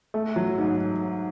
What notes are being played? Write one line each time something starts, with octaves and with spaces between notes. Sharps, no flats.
A3
F#3
G#2